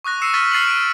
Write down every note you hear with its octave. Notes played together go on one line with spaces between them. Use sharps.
C#6 D#6 F#6 A#6
E6 C7 C#7 D#7 E7
C#6 F6 A6 B6 D#7
F6 A6 C7 C#7 D#7 F#7
D7 D#7